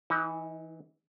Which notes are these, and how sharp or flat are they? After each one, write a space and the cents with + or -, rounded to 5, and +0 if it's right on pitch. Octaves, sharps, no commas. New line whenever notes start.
E3 -5 D#4 +35